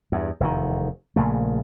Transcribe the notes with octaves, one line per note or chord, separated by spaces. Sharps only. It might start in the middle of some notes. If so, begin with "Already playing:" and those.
E2 G2
F1 E2 B2 D#3
A#1 A#2 C#3 A3